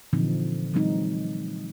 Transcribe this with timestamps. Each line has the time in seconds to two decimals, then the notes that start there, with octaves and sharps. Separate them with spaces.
0.13 A#2 D3 E3 F3 C4 D#4
0.74 E3 F#3 G#3 C4 D#4